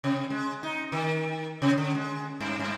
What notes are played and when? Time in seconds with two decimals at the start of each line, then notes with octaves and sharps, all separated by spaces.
0.04 C3
0.30 G#3
0.63 D#4
0.92 D#3
1.62 C3
1.78 D3
1.95 G#3
2.40 G2
2.59 G2